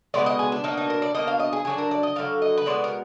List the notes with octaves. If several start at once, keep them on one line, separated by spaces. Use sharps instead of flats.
B2 G#3 B3 D5
D#5
G#4
D4
B2 A#3 D4 D#4
D#4
A#4
D5
B2 A#3 D4 D#5
F5
D#5
G#4
D3 F#3 D4 G#4
A#4
D5
D#5
D3 F#3 D4 F5
D#5
B4
B2 G#3 B3 D5
A#4